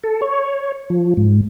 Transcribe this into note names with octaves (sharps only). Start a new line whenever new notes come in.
A4
C#5
F3
G#2